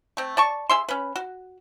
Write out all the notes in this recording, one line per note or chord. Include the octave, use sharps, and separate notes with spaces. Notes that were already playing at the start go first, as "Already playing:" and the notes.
A3 C4
D5 A5 C#6
G#4 E5 C6
C#4 B4
F#4